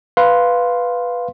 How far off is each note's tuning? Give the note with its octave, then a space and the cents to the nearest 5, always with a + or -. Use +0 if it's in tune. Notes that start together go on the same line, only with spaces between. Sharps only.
B4 +0 F5 +0 C6 +0